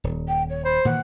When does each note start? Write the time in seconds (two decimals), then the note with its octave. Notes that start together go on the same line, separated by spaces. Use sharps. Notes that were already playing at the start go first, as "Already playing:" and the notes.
0.04 D#1
0.28 G5
0.49 C#5
0.64 C5 B5
0.85 A#2 D#3 E3 F#5